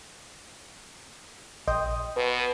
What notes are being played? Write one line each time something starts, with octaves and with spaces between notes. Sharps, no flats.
A#1 D#5 G5 C6 D#6
B2 B4